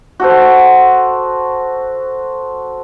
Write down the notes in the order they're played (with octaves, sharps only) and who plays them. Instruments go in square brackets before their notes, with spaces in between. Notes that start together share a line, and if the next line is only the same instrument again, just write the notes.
[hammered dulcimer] F#4 A4 C5